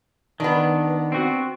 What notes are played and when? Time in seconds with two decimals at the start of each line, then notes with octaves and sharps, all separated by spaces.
0.40 D#3 B3 D4
1.12 C4 F#4